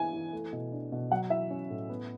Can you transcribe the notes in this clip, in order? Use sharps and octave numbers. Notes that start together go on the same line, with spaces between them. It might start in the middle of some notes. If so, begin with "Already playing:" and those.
Already playing: E3 B3 E4 G#5
E3
A3
B2
D4
B2
F#3 F#5
E4 E5
C#4
A2
B3